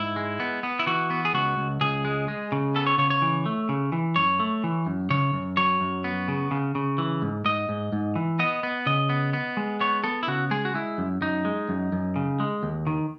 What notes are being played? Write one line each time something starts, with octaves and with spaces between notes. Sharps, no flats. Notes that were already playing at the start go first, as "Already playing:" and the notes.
Already playing: G#2 E4
G#3
B3
B3
E4
E3 F#4
B3
G#4
C#2 F#4
C#2
C#2 G#4
G#3
G#3
C#3
B3 A4
C#5
C#3 C#5
C#5
E3
A3
C#3
E3
F#2 C#5
A3
E3
F#2
C#3 C#5
F#2
F#3 C#5
F#2
B3
C#3
C#3
C#3
E3
G#2
G#2 D#5
G#2
G#2
E3
B3 D#5
B3
C#3 D#5
B3
B3
G#3
B3 C#5
B3 A4
E4
C#3 F#4
G#3 G#4
F#4
G#3 E4
F#2
F#2 D#4
G#3
F#2
F#2
C#3
G#3
D#2
D#3